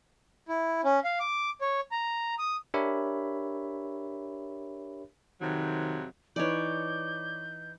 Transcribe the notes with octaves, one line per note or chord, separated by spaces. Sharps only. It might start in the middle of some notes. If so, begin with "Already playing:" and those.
E4
C#4
F5
D6
C#5
A#5
D#6
D4 G4 A#4 C#5 E5 B5
F2 C3 D#3 F#3
E3 D#4 B4 C#5 D5 G6